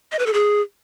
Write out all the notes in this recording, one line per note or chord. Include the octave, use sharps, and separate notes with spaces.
D#5
B4
A4
G#4